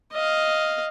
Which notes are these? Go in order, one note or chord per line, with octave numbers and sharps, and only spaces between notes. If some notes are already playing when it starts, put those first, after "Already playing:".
D#5 F5